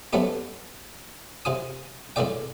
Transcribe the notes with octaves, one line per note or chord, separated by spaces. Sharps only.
F3 A3 B3 C#4 D#4 G4
C3 F4 G#5 D#6
A2 D#3 F4 G#4 D5 G5